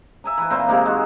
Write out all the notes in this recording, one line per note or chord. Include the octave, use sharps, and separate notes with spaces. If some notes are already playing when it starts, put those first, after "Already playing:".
E5 G#5 A#5
E3 B4
A#2 C4 A#4 C5
C3 G#3 A#3 D#4
G#3 F#4 G#4